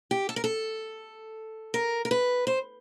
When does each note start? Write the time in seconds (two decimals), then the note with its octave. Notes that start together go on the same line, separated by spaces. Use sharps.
0.11 G4
0.29 A4
0.36 A#4
0.44 A4
1.74 A#4
2.05 A#4
2.11 B4
2.47 C5